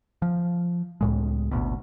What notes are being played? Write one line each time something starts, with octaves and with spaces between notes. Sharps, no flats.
F3
C#2 A2 G#3
G#1 D2 B2